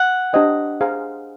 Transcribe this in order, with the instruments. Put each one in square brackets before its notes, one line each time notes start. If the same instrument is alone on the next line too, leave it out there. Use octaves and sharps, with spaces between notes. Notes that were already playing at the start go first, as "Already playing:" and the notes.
Already playing: [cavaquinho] F#5
[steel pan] D4 G4 C5 D#5 G5
G#4 C5 F5 A#5